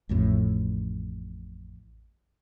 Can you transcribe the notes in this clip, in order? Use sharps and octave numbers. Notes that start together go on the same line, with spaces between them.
A1 F2 A2